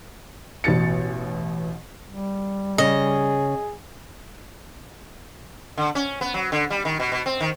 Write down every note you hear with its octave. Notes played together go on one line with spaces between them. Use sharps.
A1 B2 A6 C#7
G3
C#3 G#4 D#5
D3
C#4
B3
F#3
D3
G3
D#3
B2
B2
C4
D#3